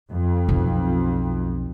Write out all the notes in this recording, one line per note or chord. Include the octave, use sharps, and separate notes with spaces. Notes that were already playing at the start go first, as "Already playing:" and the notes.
F2
B1